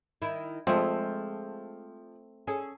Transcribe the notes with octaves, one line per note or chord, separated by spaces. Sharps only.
D#3 E4
F3 G#3 A3 C4
C#4 G#4 A4